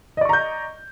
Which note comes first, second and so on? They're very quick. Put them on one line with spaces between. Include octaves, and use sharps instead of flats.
D#5 D5 C#6 A#5 G6